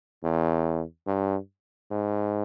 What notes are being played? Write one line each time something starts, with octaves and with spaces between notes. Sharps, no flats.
E2
G2
G#2